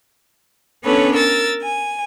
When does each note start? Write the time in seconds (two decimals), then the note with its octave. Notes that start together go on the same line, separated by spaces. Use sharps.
0.83 B3 C#4 D4 A4 B4 C#5
1.13 A#4 E6 A6
1.62 G#5